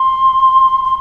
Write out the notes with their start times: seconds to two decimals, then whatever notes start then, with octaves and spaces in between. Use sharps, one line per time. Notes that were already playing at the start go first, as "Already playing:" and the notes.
Already playing: C6
0.84 C6